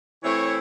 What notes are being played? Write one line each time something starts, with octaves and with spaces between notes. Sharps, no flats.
E3 A3 C4 E4 C#5